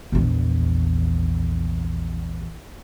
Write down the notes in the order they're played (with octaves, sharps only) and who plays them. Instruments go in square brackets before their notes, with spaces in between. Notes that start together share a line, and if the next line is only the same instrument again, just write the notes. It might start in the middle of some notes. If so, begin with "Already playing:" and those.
[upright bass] A#1 E2